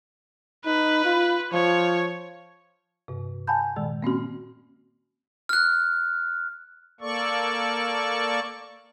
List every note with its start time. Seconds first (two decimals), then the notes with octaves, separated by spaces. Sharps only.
0.66 D#4 B4
1.05 F4
1.53 F3 C#5
3.08 G2 C3
3.47 F#5 G#5 A5 B5 G6
3.76 A#2 D#3 G#3
4.03 A#3 C4 C#4 F#4
5.49 F6 F#6
7.01 A#3 A4 D5 C#6